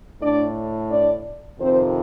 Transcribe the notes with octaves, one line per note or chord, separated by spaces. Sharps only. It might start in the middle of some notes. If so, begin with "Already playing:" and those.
A2 D4 D5
D4 D5
F2 C3 D#3 C4 C5